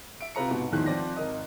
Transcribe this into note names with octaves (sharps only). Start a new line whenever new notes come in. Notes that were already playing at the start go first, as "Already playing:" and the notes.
E5 D7
C3 F4 B4 A#5 C#7
G#2 B2
E2 A2 D#3 F3 G#3 F#6
F3 C4 D5 A#6
G#1 A#4 D#5